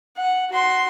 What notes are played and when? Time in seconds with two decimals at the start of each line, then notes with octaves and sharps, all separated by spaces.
0.17 F#5
0.50 F#4 C6